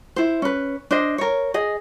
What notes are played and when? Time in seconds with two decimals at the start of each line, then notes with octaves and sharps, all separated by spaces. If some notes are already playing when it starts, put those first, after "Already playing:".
0.16 E4 C5
0.42 C#4 B4
0.91 D4 C5 D#5
1.18 A#4 C#5
1.54 G#4 D#5